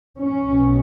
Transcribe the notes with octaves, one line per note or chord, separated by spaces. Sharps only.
C#4
B1 B2